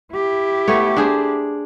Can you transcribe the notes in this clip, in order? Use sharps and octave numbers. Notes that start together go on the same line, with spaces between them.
E4 G4
A3 B3 C#5
D4 G#4 C5